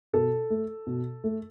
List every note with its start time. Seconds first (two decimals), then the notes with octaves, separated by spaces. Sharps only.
0.13 B2 A4
0.50 A3
0.87 B2
1.24 A3